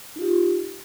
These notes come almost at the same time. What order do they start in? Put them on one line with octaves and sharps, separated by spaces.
D#4 F4 G4